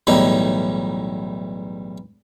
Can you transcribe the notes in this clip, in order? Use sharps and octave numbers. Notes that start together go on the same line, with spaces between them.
B1 E2 A2 G3 D#4